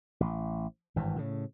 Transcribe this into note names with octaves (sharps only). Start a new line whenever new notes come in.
A1
G#1 G2 E3
A2 C#3